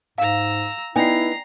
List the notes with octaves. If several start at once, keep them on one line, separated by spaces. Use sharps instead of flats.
G#2 F5 A#5 E6
B3 D#4 E4 D5 G5 G#5 A#5 C7